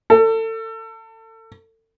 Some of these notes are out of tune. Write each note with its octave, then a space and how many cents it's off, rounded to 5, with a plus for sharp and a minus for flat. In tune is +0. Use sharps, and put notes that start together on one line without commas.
A4 +30